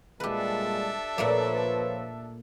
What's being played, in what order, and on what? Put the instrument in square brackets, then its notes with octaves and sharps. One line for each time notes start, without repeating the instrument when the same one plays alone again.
[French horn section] A#2 G3 G#3 [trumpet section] D4 A4 E5 [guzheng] G4 B4
[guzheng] A#2 A3 A#3 [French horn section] F3 B4 C#5